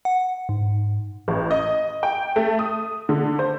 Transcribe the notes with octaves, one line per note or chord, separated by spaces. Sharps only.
F#5
G#2
A1
D#5
G5
A3
D#6
D3
C5